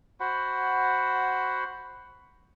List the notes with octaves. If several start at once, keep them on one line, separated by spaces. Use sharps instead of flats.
F#4 C5 F#5 B5